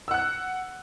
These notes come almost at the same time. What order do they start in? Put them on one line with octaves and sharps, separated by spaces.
E6 F#5 F#6